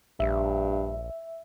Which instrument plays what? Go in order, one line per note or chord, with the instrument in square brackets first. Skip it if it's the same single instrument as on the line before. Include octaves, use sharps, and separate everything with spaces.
[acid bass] A#1 [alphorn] G2 [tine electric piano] E5